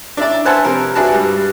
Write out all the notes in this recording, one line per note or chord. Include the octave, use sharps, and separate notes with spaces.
D4 E4 D5
B4 C5 E5 F#5 G#5 A5
C3 F3 A#4
D4 E4 F#4 G#4 B4 A5
G2 G3